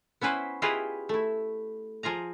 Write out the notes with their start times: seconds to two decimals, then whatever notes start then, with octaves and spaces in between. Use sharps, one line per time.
0.21 B3 C#4 E4 B4 C5
0.62 E4 F4 G4 G#4 B4 D#5
1.09 A3 E4
2.03 F3 F4 G#4 A#5